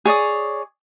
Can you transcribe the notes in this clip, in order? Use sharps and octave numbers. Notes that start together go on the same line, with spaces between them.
G#4 C#5 D5 D#6